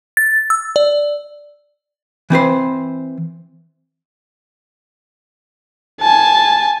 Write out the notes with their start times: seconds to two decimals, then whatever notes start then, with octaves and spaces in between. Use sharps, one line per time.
0.17 A6
0.50 E6
0.76 D5
2.30 E3 C4 B4 C5
6.01 G#5 A5